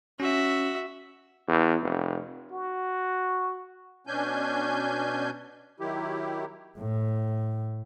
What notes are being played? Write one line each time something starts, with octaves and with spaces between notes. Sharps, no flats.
C#4 F#4 E5
E2
F1
F#4
B2 C#4 D4 G#5 G6
D#3 F#3 E4 G4
A2